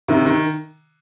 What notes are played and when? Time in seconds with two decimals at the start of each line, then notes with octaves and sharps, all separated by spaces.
0.08 C3 D#3
0.26 D#3